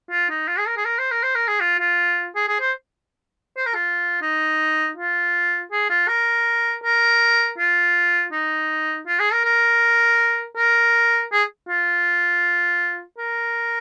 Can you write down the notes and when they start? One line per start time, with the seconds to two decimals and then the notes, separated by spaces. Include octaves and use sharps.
0.11 F4
0.29 D#4
0.48 F4
0.58 G#4
0.66 A#4
0.77 G#4
0.85 A#4
0.98 C5
1.11 A#4
1.23 C5
1.35 A#4
1.48 G#4
1.60 F4
1.79 F4
2.35 G#4
2.48 G#4
2.60 C5
3.56 C5
3.66 A#4
3.74 F4
4.21 D#4
4.97 F4
5.71 G#4
5.90 F4
6.08 A#4
6.83 A#4
7.58 F4
8.32 D#4
9.07 F4
9.19 G#4
9.32 A#4
9.45 A#4
10.56 A#4
11.32 G#4
11.69 F4
13.18 A#4